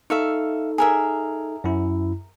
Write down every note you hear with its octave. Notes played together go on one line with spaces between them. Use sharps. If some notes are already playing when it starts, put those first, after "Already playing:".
D#4 A4 E5 F5 C#6
G#4 A#4 E5
F#2 E4